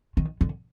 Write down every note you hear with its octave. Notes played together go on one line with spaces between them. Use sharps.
D#3
D3